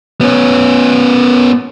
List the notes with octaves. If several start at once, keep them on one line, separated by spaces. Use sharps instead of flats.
B3 C#4